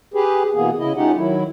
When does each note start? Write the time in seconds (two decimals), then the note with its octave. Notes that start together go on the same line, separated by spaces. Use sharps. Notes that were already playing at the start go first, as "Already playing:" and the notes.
0.14 G4 G#4 B4
0.54 B2 E3 A#3 B3 G#4
0.79 C#3 E4 D#5
0.96 A3 C#4 D#4 F4 G4 F#5
1.16 D#3 F#3 E4